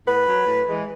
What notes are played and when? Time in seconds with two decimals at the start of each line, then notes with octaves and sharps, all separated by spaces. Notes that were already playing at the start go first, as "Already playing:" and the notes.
0.07 A2 B4
0.27 F#3
0.46 A2
0.66 E3 G#3